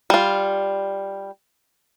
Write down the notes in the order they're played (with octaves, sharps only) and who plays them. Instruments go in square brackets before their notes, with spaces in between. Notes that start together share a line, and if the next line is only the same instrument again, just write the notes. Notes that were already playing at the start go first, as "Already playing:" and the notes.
[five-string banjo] G3 F4